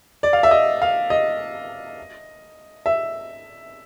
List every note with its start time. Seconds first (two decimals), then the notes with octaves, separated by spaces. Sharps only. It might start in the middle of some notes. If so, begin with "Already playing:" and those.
0.23 D5
0.33 F5
0.43 E5
0.51 D#5
0.82 F5
1.10 D#5
2.86 E5